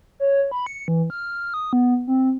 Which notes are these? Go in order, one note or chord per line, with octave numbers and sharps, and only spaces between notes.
C#5
B5
C#7
E3
F6
D#6
B3
C4